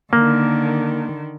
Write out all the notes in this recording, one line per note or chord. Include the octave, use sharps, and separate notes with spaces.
D3 D#3 A#3